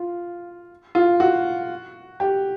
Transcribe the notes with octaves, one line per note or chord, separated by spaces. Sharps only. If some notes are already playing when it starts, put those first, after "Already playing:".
Already playing: F4
F4
F#4
G4